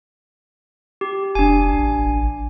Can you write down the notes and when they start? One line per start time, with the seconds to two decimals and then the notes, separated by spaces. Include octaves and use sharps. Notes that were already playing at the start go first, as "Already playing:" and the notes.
1.01 G4
1.35 F1 D4 G#5
1.74 A1